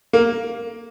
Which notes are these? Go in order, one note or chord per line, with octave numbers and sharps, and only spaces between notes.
A#3